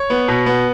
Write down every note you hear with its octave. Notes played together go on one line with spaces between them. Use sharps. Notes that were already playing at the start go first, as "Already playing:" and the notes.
Already playing: C#5
B3
B2
B3